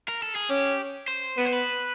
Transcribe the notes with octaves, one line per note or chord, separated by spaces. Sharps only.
A#4
A4
G#4
C#4 G4
C5
B3 B4
C5
B4